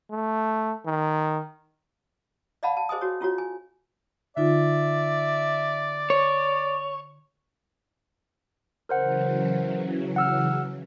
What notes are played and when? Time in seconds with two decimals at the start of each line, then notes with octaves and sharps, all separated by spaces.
0.11 A3
0.86 D#3
2.63 D5 D#5 F5 F#5 A5 B5
2.77 A5
2.89 G#4 C5 D#5 G#5 D#6
3.01 F#4 C#5
3.21 C#4 F4 F#4 C#5
3.38 G#5
4.37 D3 D#4 F4 D5 E5
6.10 C#5
8.89 C#3 E3 F#3 A#4 C5 F#5
10.16 F#5 E6 F6